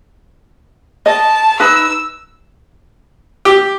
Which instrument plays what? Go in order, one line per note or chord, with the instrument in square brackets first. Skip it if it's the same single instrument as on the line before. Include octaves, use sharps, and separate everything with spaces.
[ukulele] D#5 [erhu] A5
[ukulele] D#4 B4 [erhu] E6
[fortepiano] G4